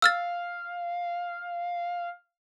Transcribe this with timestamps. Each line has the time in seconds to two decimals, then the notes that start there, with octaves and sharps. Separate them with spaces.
0.02 F5 E6 F6 A6